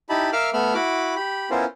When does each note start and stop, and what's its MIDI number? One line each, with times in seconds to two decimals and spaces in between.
0.10 0.30 63
0.10 0.30 64
0.10 0.30 67
0.10 0.30 81
0.10 0.30 83
0.33 0.50 70
0.33 0.50 76
0.33 0.50 77
0.33 0.50 86
0.33 0.50 88
0.33 0.50 89
0.53 0.74 57
0.53 0.74 59
0.53 0.74 76
0.53 0.74 83
0.53 0.74 89
0.74 1.15 64
0.74 1.15 66
0.74 1.15 83
0.74 1.15 86
1.16 1.49 67
1.16 1.49 83
1.51 1.65 59
1.51 1.65 61
1.51 1.65 64
1.51 1.65 65
1.51 1.65 70
1.51 1.65 72